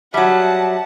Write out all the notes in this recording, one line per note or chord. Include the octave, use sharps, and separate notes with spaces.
F#3 G3 E5 F#5 A5